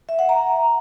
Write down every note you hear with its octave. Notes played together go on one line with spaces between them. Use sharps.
E5
F#5
A#5